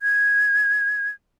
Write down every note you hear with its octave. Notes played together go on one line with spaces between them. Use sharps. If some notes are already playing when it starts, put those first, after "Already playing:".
G#6